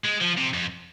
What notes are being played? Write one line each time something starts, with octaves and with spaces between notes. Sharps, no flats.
G#3
F3
C3
F2